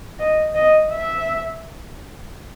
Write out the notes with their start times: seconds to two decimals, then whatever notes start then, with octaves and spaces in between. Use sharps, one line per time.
0.19 D#5
0.55 D#5
0.91 E5